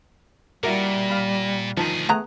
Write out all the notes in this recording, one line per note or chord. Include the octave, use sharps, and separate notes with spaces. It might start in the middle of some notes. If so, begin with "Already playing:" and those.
A#2 G3 E4 F#4 A#4
F5 B5
D2 D#3 F3 G#4 A5
A3 B3 G#4 A#5 F#6